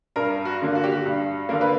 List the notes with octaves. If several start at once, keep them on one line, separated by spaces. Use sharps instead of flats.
G2 A#4
F#4
D3 A#3
F#4
G4
F#4
G2
D3 A#3 A#4
B4